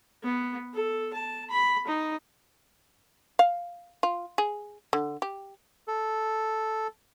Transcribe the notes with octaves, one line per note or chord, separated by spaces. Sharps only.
B3
A4
A5
B5
D#4
F5
F4
G#4
D3
G4
A4